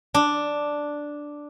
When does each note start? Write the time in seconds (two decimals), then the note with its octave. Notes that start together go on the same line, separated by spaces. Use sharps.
0.14 D4